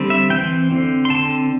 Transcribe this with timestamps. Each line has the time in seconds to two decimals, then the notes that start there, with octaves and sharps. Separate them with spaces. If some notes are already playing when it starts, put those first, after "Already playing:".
Already playing: D3 G3 C4
0.10 E5
0.30 E3 C4 G5
0.71 D3 C4
1.05 C6
1.10 D3 C4 A5